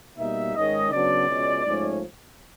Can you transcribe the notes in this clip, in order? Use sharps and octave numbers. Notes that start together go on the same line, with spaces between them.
B2 G3 A#3 D#4 E5
G#2 D#3 G#3 C#4 D#5
C#3 F#3 B3 D4 D5
C#2 B2 G#3 C#4
G#2 F3 A3 C#4